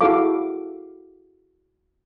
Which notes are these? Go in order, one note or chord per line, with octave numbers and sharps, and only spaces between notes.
E4 F#4 G#4 A4 F5 D6